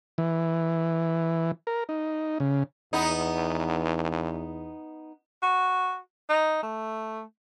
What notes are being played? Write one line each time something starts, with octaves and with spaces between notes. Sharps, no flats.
E3
A#4
D#4
C#3
E2 B3 D#4
F#4
D#4
A3